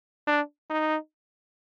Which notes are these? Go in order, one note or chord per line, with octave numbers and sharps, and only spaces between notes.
D4
D#4